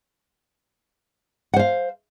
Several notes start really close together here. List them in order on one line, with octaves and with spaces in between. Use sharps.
F#5 C5 F5